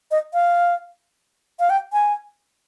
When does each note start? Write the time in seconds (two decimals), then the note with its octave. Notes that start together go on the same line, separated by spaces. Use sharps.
0.11 D#5
0.34 F5
1.60 F5
1.70 G5
1.93 G#5